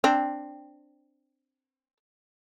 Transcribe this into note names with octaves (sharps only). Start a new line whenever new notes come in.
C4 D4